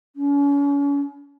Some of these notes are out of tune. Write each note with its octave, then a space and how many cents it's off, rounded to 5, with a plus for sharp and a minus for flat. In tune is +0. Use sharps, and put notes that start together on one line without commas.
C#4 +40